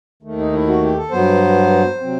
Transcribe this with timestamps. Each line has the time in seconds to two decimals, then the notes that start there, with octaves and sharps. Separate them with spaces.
0.23 D#2 D#3 A3
0.38 D#4
0.53 E4
0.67 F#4
0.82 G4
0.97 A4
1.11 G2 F#3 B3 C5
1.99 C3 F#3 C4